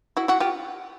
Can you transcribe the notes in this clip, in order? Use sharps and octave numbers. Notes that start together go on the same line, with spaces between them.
E4 F#4
E4 F#4
F4 G4